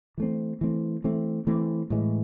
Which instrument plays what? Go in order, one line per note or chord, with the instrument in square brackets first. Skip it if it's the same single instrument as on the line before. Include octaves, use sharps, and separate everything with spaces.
[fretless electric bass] E3 A3 C4
E3 A3 C4
E3 A3 C4
E3 A3 C4
A2 E3 G#3